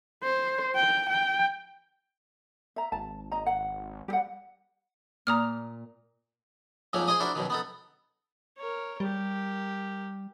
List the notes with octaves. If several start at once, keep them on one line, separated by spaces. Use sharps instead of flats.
C5
G5
G5
E5 A#5
G#1 A5
D#5 A#5
F#5
G3 G4 F#5
A#2 A#5 D#6 F6
F2 G#2 F3 F#3 A#3 C#4
G#4 C5 D#5 D#6
D4 E4 F#4 A#4 C5
F#2 B2 D#3
B3 D#4 A4
A#4 C#5
G3 G4 A#4